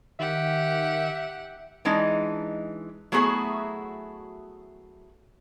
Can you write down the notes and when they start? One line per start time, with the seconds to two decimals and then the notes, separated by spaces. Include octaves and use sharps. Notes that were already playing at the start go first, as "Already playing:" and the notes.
0.19 D#3 G4 E5 F#5
1.85 E3 G#3 D4 D#4 D#5
3.12 F#3 A3 B3 E4 F#4 G#4